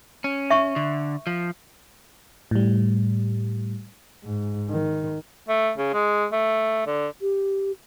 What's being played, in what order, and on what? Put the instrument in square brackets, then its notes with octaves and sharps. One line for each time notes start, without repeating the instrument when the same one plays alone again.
[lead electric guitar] C#4
[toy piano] E5 C#6
[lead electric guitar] D3
F3
[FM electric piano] A2 G3
[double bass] G#2
D#3
[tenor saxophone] A3
C#3
G#3
A3
D3
[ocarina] G4